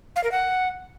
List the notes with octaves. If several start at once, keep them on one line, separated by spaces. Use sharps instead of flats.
F5
A#4
F#5